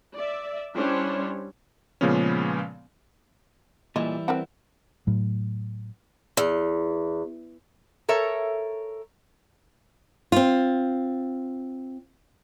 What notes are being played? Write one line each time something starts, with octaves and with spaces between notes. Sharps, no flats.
D5 E5
G3 C#4 D4 E4 C5 C#5
A#2 C#3 F3 G#3 B3 C#4
A#2 E3 G3 G#3 E4 D#5
C4 A#4 B4 F#5
A2 F#3
E2
A4 A#4 C#5 E5
C4 F4